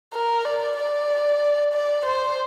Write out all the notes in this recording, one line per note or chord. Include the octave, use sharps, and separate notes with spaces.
A#4
D5
D5
D5
C5